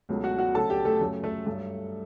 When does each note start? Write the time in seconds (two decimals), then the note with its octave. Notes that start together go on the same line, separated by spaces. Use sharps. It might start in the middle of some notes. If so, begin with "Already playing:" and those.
0.09 C#2 B2 F#3 A3
0.24 F#4 F#5
0.38 F#4 F#5
0.54 D2 C#3 F#3 A3 A4 A5
0.70 G4 G5
0.85 A3 A4
1.01 F#2 C#3 F#3 A3
1.23 A3 A4
1.46 G2 F#3 A3